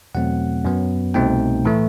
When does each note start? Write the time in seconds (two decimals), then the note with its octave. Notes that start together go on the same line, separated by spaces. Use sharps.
0.15 E2 B2 F#3 A3 C4 F#5
0.65 F#2 F#3 B3
1.14 C2 B2 A3 C4 D#4 G5
1.65 A2 E3 A3